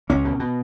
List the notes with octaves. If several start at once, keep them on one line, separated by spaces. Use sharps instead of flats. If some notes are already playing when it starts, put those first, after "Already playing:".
C#2 C#4
B2
B2